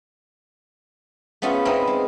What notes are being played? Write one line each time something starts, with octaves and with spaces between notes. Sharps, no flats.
A3 B3 C#4 F4 G#4 E5
B3 C4 D#4 E4 A#4 C#5
G#3